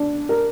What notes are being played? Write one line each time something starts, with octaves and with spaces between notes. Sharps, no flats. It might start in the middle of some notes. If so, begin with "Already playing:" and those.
Already playing: D4
A#4